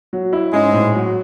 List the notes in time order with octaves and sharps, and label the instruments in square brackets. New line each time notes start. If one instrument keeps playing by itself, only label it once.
[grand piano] F#3
E4
[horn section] G#2 G#3 [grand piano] C#4
[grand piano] A2
F#3